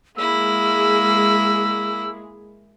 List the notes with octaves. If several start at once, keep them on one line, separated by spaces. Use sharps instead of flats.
G#3 A#3 E4 G#4 E6